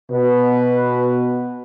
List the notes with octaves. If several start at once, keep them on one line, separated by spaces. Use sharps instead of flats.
B2 B4